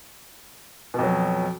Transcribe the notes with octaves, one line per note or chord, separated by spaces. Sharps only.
F2 B2 F#3